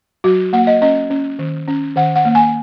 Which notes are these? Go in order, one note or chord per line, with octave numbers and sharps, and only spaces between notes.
F#3 F#4
A#3 F#5
D#5
C#4 D#5
C#4
D#3
C#4
D#3 F#5
F#5
A#3
G#5